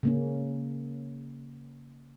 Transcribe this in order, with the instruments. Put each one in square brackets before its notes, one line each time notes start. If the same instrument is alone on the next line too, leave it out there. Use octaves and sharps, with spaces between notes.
[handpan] C#3 A#3 C#4